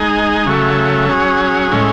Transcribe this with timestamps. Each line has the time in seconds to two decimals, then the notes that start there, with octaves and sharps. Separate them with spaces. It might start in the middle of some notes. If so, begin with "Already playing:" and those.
Already playing: G#3 D#4 G#4
0.46 C#3 F#3 A3
1.09 F#3 C#4 G#4
1.72 A2 G#3 C#4